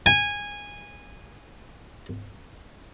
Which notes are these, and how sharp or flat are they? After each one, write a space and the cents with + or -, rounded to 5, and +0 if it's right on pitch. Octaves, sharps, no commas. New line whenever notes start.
G#5 -15